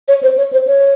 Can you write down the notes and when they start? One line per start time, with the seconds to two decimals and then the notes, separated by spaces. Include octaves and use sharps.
0.08 C#5
0.23 C5
0.38 C#5
0.53 C5
0.67 C#5